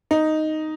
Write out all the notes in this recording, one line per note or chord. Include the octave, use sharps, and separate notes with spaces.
D#4